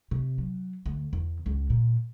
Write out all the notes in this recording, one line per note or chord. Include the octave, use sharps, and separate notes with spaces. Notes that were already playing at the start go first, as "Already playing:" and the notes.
C3
F#3
D2
E2
C#2
A#2